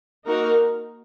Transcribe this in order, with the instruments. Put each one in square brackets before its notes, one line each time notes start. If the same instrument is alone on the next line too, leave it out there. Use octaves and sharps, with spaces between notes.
[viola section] A#3 D#4 F#4 A#4